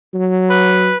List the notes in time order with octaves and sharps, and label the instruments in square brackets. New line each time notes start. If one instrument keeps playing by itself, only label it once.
[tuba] F#3
[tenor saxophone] B4